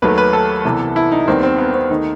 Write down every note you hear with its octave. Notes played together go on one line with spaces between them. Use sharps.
D#2 D#3 F#3 A3 B4
B4
A4
C2 C3 E3 B3
E4
D#4
D#2 D#3 G3 B3 C4
C4
B3
C4
D#2 D#3 A3 D#4